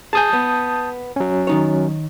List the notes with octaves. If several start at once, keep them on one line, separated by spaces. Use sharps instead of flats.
G#4 G#5 A5 D#6 G6
B3
F#3 C#4
D#3 D#4 C#5